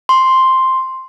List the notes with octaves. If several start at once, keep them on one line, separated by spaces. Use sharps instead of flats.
C6